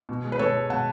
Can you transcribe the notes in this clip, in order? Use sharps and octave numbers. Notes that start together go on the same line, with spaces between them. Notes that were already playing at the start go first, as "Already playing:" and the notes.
B2
G#3
B4
B2 A4 C#5
G#3
B2 F#5 A5